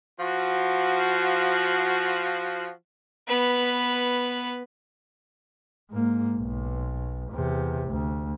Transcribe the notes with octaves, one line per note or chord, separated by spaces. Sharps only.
F3 F#4
B3 B4
G#2 A#3
B1
E2 C3
D2